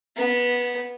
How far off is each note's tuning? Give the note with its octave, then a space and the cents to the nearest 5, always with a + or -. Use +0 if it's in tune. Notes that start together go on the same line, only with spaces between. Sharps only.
B3 -15